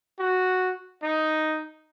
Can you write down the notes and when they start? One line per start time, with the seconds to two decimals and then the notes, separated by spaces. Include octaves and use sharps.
0.19 F#4
1.02 D#4